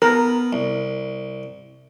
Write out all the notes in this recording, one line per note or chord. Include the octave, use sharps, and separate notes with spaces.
B3 A#4
C2